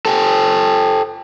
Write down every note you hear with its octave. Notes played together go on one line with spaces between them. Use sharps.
G4 A4